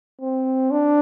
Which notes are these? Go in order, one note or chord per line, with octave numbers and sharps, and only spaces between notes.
C4
D4